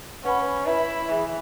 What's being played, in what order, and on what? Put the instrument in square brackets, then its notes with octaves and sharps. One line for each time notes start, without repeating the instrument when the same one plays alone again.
[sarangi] C#4 [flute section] B4 F#5 B5
[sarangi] E4 [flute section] B4 E5 B5
[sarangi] E3 [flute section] G#4 E5 B5